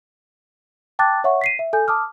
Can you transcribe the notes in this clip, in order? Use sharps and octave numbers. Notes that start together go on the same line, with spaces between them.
G5 A5 D6 F#6 A6
C#5 E5 F#5 C#6
B6 C7 D#7
E5
A4 G#5 G6
A5 D6 D#6 F6